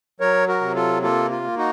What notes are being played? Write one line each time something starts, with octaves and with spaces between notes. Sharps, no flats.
F#3 A#4 C#5
F#4 A#4
C3
F4 A4
A#3 F4 A4
F4
A#3
D#4 F#4